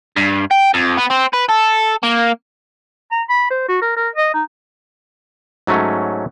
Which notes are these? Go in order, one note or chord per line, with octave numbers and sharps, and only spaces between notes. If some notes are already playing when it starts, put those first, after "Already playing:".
G2
G5
F2
B3
C4
B4
A4
A#3
A#5
B5
C5
F#4
A#4
A#4
D#5
D#4
G#2 F#3 A3 C#4